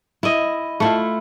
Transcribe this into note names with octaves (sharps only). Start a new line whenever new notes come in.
E4 D#5
A3 E4 F4